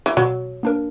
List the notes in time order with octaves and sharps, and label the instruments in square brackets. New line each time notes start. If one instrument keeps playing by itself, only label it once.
[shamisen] E3
[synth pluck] B2 [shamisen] F#3
[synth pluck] A#3 D4 A#4